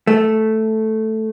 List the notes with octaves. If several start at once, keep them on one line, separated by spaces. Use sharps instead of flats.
A3